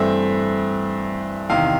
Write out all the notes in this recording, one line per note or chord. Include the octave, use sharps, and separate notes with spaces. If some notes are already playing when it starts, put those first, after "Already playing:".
Already playing: G2 E3 A3 C4 E5
E2 C3 D#3 F5